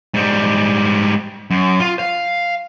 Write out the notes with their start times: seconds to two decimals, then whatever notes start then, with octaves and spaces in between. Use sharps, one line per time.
0.14 G#2 G3
1.51 F#2
1.80 F4
1.99 F5